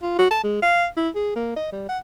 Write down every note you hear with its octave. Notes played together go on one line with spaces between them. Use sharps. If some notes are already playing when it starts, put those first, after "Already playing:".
F4
F#4
A5
G#3
F5
E4
G#4
A#3
D#5
G3
F#5